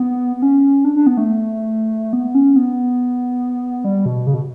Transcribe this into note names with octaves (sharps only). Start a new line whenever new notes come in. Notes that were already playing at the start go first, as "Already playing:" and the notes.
Already playing: B3
B3
C#4
D4
D4
B3
A3
B3
C#4
B3
G3
B2
C#3
B2